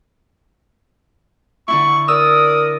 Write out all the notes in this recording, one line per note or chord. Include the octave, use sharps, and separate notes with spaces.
D3 D4 E4 C#6
A#4 D5 D#6 E6